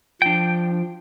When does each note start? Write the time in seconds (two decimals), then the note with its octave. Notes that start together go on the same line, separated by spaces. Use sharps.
0.22 F3 D4 G5